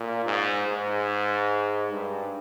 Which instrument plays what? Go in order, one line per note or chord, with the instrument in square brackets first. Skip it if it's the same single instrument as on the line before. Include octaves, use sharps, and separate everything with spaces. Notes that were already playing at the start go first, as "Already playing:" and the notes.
Already playing: [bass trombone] A#2
G#2
G#2
G2